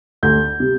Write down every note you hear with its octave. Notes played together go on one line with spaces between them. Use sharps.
D2 G6
C3